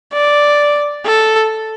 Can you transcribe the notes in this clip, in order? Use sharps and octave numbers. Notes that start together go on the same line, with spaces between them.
D5
A4